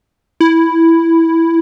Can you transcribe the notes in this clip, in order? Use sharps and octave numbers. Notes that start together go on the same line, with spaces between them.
E4